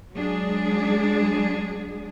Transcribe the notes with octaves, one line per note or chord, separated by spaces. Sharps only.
F#3 G#3 D4 G#4